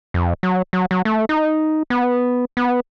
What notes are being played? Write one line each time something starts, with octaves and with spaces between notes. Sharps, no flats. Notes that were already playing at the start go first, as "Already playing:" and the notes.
F2
F#3
F#3
F#3
A3
D#4
B3
B3